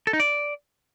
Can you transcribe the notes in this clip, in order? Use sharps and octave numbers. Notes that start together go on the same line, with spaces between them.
A4
D#4
D5